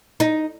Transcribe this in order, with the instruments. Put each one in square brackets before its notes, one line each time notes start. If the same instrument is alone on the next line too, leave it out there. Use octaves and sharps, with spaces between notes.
[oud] D#4